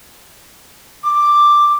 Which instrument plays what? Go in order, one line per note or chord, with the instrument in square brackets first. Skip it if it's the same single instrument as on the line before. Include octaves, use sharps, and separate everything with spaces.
[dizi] D6